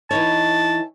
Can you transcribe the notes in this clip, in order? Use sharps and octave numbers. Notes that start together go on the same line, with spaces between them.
E3 D#4 C#5 A5